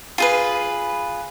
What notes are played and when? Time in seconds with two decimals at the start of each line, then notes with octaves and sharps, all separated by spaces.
0.18 F4 G#4 B4